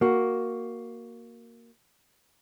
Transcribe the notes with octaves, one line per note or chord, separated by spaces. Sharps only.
A#3 F#4